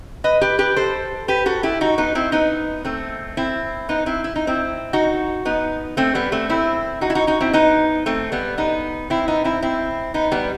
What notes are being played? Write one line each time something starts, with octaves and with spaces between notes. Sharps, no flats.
B4 D#5
G4 B4
G4 B4
A4 C5
G4 B4
F#4 A4
E4 G4
D#4 F#4
B3 D#4
C4 E4
B3 D#4
A3 C4
C4 E4
B3 D#4
C4 E4
E4
D#4
C4 E4
D#4 F#4
B3 D#4
A3 C4
G3 B3
A3 C4
C4 E4
D#4 F#4
E4
D#4 F#4
D#4 F#4
C4 E4
B3 D#4
A3 C4
G3 B3
B3 D#4
C4 E4
B3 D#4
C4 E4
C4 E4
B3 D#4
G3 B3